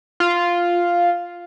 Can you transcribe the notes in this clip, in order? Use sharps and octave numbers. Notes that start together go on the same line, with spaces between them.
F4